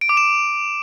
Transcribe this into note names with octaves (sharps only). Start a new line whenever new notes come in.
D7
D6
E7